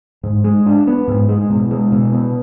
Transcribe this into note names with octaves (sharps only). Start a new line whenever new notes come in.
G#2
G#3
D4
B3
G#2
G#3
B2
G#3
B2
B3